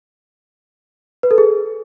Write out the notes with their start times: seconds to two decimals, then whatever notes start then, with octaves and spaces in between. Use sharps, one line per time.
1.23 B4
1.31 A4
1.38 G#4